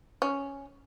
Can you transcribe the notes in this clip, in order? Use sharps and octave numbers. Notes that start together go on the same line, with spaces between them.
C#4